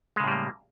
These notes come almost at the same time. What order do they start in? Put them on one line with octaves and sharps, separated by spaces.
G#3 C#3 A2 G3 A#3